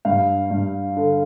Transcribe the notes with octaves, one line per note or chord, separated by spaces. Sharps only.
G2 F5
G2
D3